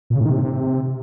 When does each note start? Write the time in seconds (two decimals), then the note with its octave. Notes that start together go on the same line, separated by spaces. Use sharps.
0.10 A#2
0.15 C#3
0.20 A2
0.25 D#3
0.30 C3